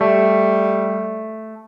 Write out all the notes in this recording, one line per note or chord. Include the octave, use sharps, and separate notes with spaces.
G3 A3